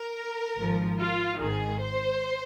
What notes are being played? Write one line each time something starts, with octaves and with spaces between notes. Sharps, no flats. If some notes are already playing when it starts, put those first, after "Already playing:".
Already playing: A#4
G#1 G#2 F3
F4
G#1 G#2 D#3 G#4
C5